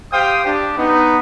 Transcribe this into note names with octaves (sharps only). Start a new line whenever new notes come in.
G4 C5 F5 G5 D#6
D4 G4
B3 D#4